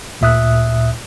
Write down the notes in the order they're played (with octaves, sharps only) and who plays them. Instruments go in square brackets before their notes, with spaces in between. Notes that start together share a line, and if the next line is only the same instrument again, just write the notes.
[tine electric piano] D2 A#2 E5 D#6 F#6